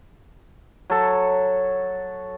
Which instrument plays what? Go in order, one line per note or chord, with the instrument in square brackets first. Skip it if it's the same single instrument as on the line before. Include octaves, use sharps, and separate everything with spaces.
[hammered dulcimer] F#3 A4